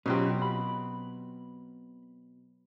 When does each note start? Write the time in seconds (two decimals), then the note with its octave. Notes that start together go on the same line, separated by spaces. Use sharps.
0.06 B2 F#3 C4 C#4 F4 G4
0.42 B5